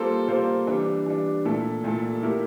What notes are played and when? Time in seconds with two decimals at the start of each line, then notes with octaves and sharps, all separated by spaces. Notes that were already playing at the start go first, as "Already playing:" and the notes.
Already playing: G3 A#3 F4 A4 C5
0.28 G3 A#3 F4 A4 C5
0.67 E3 G3 D4
1.06 E3 G3 D4
1.45 A#2 A3 E4 A4
1.84 A#2 A3 E4 A4
2.23 A3 E4 G4 A#4